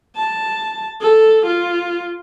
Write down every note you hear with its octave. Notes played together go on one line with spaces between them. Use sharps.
A5
A4
F4